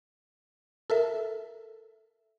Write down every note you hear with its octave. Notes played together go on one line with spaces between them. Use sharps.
A4 A#4 E5